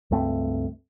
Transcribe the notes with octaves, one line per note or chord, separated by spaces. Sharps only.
C#2 G2 A3 C4